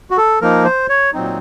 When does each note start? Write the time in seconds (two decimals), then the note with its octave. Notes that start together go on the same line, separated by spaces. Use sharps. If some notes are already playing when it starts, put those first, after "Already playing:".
0.11 F#4
0.17 A4
0.41 F3 A#3 D#4 A#4
0.65 C5
0.89 C#5
1.13 A#2 F#3 C4 D#4